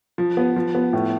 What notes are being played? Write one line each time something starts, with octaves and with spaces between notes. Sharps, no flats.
F3
B3
F3
B3
A2